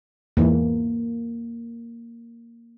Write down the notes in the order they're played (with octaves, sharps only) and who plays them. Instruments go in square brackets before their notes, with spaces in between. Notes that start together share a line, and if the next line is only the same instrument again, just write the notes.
[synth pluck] E2 G#2 E3 [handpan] A#3